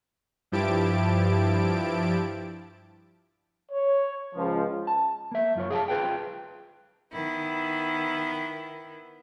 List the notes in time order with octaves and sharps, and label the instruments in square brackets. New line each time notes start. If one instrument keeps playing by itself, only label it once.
[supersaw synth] G2 F3 E4 G4 A5 D7
[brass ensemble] C#5
C#2 F3
[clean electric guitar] A5
A#3 E5
F#2 F4 C#5
G#4 F5 G5 A5
F4 G#4 B4 C5 G5
[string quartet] D#3 B3 E4